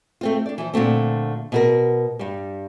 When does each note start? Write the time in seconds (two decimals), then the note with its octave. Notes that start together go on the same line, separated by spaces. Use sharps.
0.21 A3 C4 F4
0.46 D4 D5
0.58 E3 F3
0.74 A#2 D3 A3 C4
1.52 B2 F#4 A#4
2.19 G2 G3